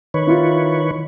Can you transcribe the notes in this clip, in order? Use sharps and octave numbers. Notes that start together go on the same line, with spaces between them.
D#3 B4 C#5
E4 F4